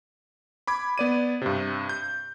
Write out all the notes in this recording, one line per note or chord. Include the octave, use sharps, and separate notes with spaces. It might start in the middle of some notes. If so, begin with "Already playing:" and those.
B5 D6 G#6
B3 D5 D#7
G2 C3
G6